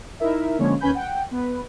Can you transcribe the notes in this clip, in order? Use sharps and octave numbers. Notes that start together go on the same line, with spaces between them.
D#4 E4 A#4 E5
D3 F3 G#3 A#3 C#4 C#5
D#2 C#4 B4 G#5 B5 G6
F#5 G5
B3 B4